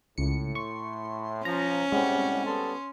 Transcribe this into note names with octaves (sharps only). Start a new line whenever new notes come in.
C#2 A2 C#7
C6 C#6
F3 C#4 A#5
C2 A2 G3 G#3 C4 F#5
G3 B3 A4 C6